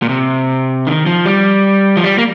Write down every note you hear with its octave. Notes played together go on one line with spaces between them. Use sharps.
A#2
C3
D#3
F3
G3
F3
G3
A#3